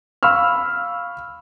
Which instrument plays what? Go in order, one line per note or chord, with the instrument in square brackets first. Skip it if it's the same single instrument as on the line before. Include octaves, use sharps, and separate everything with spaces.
[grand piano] F5 B5 C#6 E6 F6